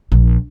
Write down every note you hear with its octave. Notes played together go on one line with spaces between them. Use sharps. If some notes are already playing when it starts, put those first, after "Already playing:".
A#1